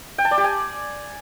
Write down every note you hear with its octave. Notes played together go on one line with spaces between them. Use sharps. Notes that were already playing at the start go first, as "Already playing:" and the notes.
G5
A5
D5
G4
G#5